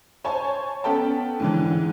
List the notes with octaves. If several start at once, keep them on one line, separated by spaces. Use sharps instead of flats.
C5 C#5 G#5 A5
B3 C#4 A4 G5 A5
G#2 D3 E3